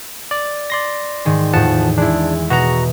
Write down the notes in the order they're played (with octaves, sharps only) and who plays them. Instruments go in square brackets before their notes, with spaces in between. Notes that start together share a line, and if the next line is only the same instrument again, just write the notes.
[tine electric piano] D5
D5 C6 A#6
[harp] G#2 D#3 G#3
[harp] E2 A2 [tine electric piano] F3 F#5 A5
[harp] G#3 E4 [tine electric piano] D4
[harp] B2 [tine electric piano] F#4 F#5 A#5